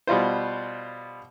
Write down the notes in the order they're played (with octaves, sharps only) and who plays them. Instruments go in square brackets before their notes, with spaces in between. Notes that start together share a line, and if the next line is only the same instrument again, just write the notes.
[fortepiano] B2 G3 F4 C5